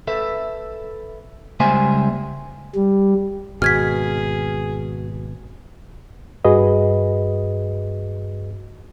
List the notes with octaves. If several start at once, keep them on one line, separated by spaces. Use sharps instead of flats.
A4 B4 E5
C#2 G3 A#3 C5 E5 G#5
G3
G#1 B2 F#4 G#4 F6 G#6 B6
G2 F#4 G#4 B4 D#5